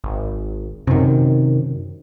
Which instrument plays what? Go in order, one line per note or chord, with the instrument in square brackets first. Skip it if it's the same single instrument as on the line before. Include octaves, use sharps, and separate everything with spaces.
[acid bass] G#1
[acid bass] F#2 [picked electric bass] C3 D#3